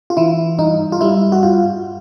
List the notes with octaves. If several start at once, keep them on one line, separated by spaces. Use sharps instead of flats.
F4
E3 E4
G2 D#4
F4
G3 E4
F#4
G2 F4